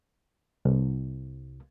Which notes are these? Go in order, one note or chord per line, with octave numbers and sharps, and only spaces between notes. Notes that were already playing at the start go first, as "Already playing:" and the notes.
C2